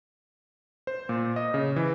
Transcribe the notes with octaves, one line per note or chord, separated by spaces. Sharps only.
C5
A#2
D#5
C#3
E3